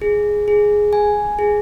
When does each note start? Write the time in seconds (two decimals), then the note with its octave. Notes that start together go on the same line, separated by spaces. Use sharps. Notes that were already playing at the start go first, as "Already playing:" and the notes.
0.02 G#4
0.48 G#4
0.93 G#5
1.39 G#4